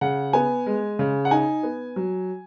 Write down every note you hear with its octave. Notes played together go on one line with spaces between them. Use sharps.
C#3 F#5
B3 G#5
G#3
C#3
F#5
D#4 G#5
B3
F#3